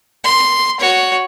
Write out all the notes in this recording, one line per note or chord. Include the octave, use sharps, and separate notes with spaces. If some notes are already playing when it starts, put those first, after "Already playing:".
C6
F#4 C#5